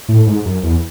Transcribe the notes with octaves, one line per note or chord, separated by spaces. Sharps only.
A2
G#2
F#2
E2